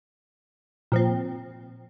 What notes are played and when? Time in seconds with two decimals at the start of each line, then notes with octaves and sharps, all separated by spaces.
0.92 A#2 F3 C4